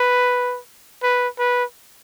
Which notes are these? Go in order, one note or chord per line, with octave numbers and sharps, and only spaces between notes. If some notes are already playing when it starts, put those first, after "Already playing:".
Already playing: B4
B4
B4